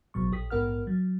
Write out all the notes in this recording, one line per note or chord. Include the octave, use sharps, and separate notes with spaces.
A1 B2 F#3 C#6
A#1 G4 D#6 B6
A#1 G#2 B3 A#4 F#5 F6
F#3